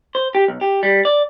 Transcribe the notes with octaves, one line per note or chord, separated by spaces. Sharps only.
C5
G4
B1
G4
G3
D5